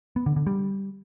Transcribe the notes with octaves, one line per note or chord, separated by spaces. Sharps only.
B3
D3
D3
G3